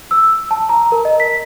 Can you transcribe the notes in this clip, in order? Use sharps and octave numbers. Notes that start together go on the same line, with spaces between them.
E6
A5
A#5
A#4
D#5
B6